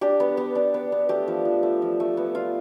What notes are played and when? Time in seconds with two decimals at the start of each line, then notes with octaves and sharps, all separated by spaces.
0.01 D4 G4
0.20 B3
0.37 B3
0.55 D4
0.74 B3
0.92 B3
1.09 A3 G4
1.28 F3
1.45 F3
1.63 A3
1.82 F3
2.00 A3
2.17 B3
2.35 F4